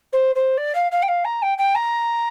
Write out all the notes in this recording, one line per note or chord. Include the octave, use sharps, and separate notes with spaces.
C5
C5
D5
F5
F5
G5
F5
A#5
G5
G5
A#5